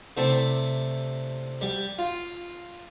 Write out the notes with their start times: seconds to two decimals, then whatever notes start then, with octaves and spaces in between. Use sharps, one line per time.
0.17 C3 A3 C4 E4 D5
1.61 G3 G4
1.99 F4